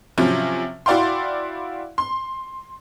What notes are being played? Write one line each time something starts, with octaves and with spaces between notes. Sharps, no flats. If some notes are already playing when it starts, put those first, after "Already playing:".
C3 F3 F#3 C#4
E4 F#4 D5 F5 G5 C6
C6